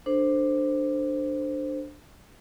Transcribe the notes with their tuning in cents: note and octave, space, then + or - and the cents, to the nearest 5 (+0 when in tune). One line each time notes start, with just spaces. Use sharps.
D4 +10 A4 +20 C5 +0